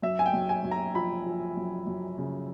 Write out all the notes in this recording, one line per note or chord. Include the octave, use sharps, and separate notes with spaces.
F#2 E5
G#5
G5
F#2
G#5
F#2
A#5
F3 B5
F3
F#2
F#2
C#3